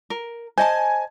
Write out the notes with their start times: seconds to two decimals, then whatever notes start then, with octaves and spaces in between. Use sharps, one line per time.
0.10 A#4
0.58 C5 D#5 G#5 A5